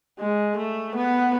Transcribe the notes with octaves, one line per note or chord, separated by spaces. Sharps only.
G#3
A3
B3